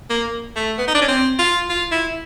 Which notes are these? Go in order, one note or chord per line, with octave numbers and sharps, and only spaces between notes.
A#3
A3
B3
D#4
D4
C#4
C4
F4
F4
E4